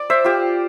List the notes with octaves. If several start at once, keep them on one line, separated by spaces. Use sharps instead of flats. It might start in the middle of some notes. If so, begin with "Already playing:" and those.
Already playing: D5
C5 E5
F4 G4